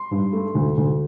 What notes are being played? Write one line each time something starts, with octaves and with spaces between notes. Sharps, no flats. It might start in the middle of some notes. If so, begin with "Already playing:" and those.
Already playing: C6
G2
A3
D2
D2